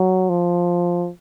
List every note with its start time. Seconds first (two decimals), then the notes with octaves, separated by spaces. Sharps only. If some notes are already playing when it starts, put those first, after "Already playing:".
Already playing: F#3
0.29 F3